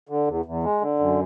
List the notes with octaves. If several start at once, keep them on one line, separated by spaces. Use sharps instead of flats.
D3
E2
E2
G#3
D3
F#2